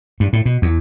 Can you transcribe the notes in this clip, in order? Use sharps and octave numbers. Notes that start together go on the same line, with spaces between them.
G2
A2
B2
E2